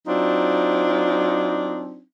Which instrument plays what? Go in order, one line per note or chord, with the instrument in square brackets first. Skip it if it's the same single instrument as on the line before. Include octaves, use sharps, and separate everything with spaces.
[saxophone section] F#3 C4 D4 D#4 F4